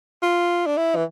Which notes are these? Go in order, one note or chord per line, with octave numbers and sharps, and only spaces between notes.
F4
D4
E4
E3